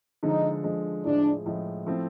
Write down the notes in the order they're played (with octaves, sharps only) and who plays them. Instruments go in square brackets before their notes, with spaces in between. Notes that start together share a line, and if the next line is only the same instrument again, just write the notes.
[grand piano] D3 F3 G#3 [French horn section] D#4
[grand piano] D3 F3 G#3
[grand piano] A2 F3 G#3 [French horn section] D4
[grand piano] A2 F3 G#3
F3 A3 C4 E4